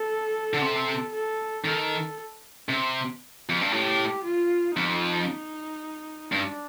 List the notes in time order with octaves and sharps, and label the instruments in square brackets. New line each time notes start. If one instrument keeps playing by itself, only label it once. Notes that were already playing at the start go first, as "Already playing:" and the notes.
Already playing: [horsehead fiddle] A4
[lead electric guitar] D3
C3
[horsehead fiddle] A4
[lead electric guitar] D#3 [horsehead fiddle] A4
[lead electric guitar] C3
F2
G2
[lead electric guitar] A2 [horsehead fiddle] G4
[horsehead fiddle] F4
[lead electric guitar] F2 [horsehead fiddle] D#4
[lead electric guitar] G2 [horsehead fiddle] D4